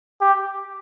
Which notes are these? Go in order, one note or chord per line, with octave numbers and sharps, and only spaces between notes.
G4